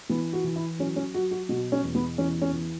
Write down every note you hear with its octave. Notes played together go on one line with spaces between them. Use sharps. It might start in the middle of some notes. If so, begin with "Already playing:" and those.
E3 B3
F#4
E3
E4
F#3 C#4
C#4
F#3 F#4
F#4
B2 F#4
C#4
E2
B3
E3 C#4
C#4
E3